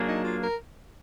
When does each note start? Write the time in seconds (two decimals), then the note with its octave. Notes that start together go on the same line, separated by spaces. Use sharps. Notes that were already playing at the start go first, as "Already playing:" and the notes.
Already playing: F#3 A#3 D4 G#4
0.08 D#4
0.24 F4
0.43 A#4